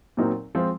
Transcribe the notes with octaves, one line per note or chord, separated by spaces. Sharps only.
A#2 F#3 C4 D#4 A#4
F3 G#3 C4 F4